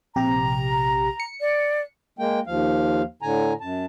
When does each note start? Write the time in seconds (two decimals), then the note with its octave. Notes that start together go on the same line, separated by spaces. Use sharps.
0.16 A#1 C3 G4 A#5
1.20 C#7
1.41 D5
2.19 G#3 A#3 G5
2.47 D#2 F3 F5
3.22 A2 D3 G#5 A#5
3.61 F#2 A5